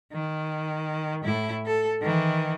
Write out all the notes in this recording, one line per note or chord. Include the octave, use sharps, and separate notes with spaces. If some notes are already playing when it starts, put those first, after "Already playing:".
D#3
A2 E4
A4
D#3 E3